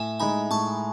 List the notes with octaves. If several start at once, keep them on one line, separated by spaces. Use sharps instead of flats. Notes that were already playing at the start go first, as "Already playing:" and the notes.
Already playing: A2 E5 G#5
G#3 D#4 G#5 B5
A2 A5 C#6